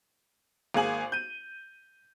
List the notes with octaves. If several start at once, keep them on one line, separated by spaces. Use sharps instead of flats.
G#1 A#3 G#4 G#5 F#7
G6 D#7